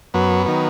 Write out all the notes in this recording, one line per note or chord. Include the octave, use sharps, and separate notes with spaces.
F#2 F#3 B3
D#3 F#3